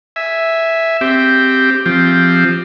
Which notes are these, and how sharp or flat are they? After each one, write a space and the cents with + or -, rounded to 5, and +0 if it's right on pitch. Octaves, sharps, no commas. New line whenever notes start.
E5 +0 G#5 +0
C4 +0 G4 +0
F3 +0 C4 +0 G4 +0